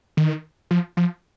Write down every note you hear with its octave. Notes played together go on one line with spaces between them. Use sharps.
D#3
F3
F3